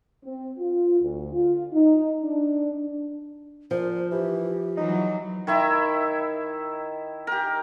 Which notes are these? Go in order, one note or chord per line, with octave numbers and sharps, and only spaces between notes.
C4
F4
D2
F4
D#4
D4
A#2 F3 C5
E3 G4
E3 F#3 D#4
D#3 E4 E5
G4 A#4